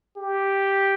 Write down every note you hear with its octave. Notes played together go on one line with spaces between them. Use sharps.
G4